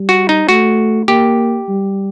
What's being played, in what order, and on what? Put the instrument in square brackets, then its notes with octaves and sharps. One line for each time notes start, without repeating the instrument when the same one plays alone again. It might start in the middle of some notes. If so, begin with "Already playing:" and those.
Already playing: [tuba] G3
[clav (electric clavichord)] F#4
D#4
[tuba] A3 [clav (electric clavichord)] F#4
[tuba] A#3 [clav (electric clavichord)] G4
[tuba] G3